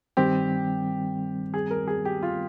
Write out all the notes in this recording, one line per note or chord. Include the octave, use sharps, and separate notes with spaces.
G2 D#3 G3 C4 G4
G#4
A#4
G#4
G4
F4